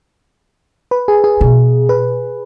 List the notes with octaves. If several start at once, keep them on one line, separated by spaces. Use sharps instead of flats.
B4
G#4
G#4
B2
B4